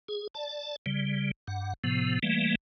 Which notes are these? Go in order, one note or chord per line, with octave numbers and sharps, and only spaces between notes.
G#4
D5 A5
C#3 G3
G2 F#5
A2 C3 F3 B3
E3 G3 A3 A#3